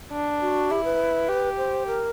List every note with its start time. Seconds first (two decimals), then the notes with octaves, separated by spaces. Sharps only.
0.12 D4
0.41 F#4
0.70 E4 G4
0.84 B4
1.28 G4
1.57 C5
1.86 A#4